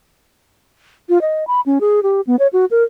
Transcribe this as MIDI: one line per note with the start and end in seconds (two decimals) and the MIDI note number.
1.09 1.21 65
1.21 1.47 75
1.47 1.61 83
1.66 1.79 61
1.81 2.03 68
2.03 2.21 67
2.27 2.36 59
2.39 2.47 73
2.53 2.65 66
2.71 2.83 70